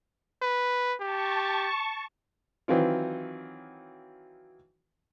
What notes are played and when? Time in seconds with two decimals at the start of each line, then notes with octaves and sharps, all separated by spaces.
0.42 B4
1.01 G4 A5 C#6
2.68 D#3 E3 F#3 C4 F4